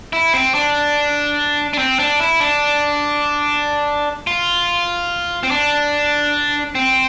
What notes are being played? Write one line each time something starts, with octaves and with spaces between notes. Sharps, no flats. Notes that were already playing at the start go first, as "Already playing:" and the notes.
E4
C4
D4
D4
C4
D4
E4
D4
F4
C4
D4
C4